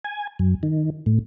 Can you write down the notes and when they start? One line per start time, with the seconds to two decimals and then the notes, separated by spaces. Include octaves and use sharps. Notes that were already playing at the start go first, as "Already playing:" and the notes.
0.05 G#5
0.39 F#2
0.63 D#3
1.06 A2